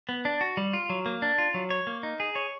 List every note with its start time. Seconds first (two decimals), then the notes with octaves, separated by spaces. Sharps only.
0.09 B3
0.25 D4
0.41 F#4
0.57 G3
0.73 F4
0.90 F#3
1.06 A#3
1.22 D4
1.38 F4
1.54 F#3
1.70 C#5
1.87 A#3
2.03 D#4
2.20 G#4
2.35 C#5